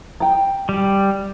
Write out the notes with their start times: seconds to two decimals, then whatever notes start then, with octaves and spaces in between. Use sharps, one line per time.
0.20 G5 A#5
0.69 G3